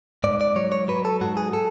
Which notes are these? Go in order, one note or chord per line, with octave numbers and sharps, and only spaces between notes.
G#2 D5
D5
F#3 C#5
C#5
F#3 B4
A4
G#2 F#4
G#4
A4